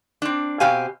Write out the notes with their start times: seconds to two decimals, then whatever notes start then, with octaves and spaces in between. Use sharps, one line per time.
0.22 C4 D4
0.60 B2 C4 G4 F5 G#5